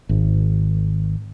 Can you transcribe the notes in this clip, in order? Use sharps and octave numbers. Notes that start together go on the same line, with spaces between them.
G#1